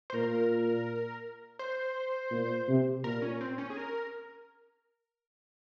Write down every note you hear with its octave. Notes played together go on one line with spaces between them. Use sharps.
C5
A#2 A#4
C5
A#2
C3
A#2 A#4
C#4
C4
C#4
G#4
A#4